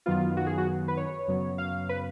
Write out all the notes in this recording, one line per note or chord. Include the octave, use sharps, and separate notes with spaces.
F#2 D#3 F#3 B3 F4
F#4
G#4
F#4
B4
C#5
F#2 C#3 F#3 B3
F5
B4